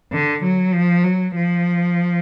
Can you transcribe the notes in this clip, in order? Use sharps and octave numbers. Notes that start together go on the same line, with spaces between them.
D3
F#3
F3
F#3
F3